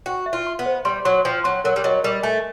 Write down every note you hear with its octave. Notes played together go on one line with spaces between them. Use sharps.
F#4 G5
E5
F4
C6
B3
C5
G3 C6
F#3 C6
F3 G5
F#3 C6
F#3 A#4
G3
F#3 D#5
G3 A#4
A3 G#5